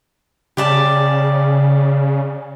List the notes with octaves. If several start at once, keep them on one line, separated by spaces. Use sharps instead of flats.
C#3 G4 D5 A5